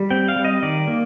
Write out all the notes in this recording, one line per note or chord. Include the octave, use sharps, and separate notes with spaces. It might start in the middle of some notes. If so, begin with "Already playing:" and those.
Already playing: G3
C4 G5
F5
G3
D#5
D#3 D5
A#3